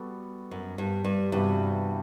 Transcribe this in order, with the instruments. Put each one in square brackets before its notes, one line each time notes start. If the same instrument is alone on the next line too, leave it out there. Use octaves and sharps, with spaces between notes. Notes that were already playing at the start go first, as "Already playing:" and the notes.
Already playing: [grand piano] G3 B3 F#4 A4
[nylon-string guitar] F#2
G2
G2
[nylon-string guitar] G2 [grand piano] C3 E3 G3 B3 F#4